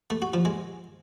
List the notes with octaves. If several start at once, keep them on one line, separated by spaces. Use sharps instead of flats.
A3
F#4
F3
G#3